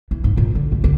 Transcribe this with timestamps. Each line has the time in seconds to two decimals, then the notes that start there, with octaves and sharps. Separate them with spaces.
0.11 E3
0.24 G#2
0.37 A#2
0.55 D3
0.72 A3
0.84 D3